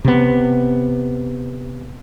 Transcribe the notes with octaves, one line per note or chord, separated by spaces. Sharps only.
C3 B3